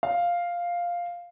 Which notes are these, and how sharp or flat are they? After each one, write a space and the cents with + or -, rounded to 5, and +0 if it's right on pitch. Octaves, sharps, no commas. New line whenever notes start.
F5 +0